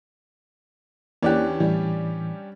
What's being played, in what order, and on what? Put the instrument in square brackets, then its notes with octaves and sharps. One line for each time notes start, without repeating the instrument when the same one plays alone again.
[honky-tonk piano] E2 E3 [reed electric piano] A#3 D5 F#6 [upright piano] C#4 D4 G4
[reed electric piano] A2 E3 [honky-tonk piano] G3